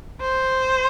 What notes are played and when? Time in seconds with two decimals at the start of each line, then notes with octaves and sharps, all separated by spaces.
0.21 C5